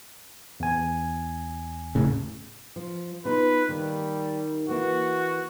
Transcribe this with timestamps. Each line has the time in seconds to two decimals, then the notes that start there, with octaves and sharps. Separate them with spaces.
0.60 E2 G#5
1.95 A2 C#3
2.76 F3
3.25 B3 D#4 F4 B4
3.69 D#2 D#3 G3
4.69 E3 A#3 E4 F#4